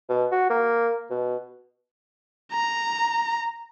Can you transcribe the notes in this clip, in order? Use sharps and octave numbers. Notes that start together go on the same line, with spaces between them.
B2
F#4
A#3
B2
A#5